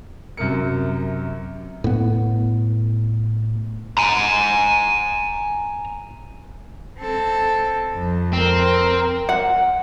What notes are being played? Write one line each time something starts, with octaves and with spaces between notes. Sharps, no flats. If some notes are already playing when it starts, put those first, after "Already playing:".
F#2 C3 A#4 C#7
A2 B3
G#5 A#5
C4 A4
F2
C4 A#4
F#5